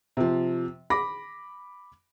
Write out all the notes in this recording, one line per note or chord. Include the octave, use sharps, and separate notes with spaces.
C3 F3
B5 D6 A#6